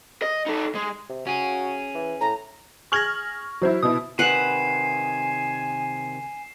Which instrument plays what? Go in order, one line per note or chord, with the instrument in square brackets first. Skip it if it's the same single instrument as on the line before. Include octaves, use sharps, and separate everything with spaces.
[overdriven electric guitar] D#5
D#4 A4
G#3
[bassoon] C3
[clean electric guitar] C#4 G#4 [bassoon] F#4
[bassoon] E3
[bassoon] A2 [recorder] A#5
[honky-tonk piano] G#4 F6 F#7 [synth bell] C#6 G#6 A#6
[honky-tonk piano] F#3 E4 [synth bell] F#4 C5
[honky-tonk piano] B2 E4 [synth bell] D#6
[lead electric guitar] C3 D#3 [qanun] B4 F#5 [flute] G#5 [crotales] C7 E7